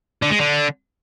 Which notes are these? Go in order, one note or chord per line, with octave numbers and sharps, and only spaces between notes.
D3
G#3
D3